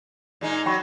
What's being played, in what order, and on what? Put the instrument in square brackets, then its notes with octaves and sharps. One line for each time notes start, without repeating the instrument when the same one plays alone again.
[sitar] A#2 G#3 D#4
[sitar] F#3 F#4 [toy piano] G5 B5 C#6